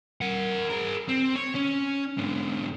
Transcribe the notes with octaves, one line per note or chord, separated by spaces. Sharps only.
A#4 F#5
G#4 A#4
C4
C#5
C#4
G#2 D3